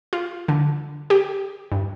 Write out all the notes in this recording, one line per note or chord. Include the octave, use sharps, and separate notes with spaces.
F4
D3
G4
G2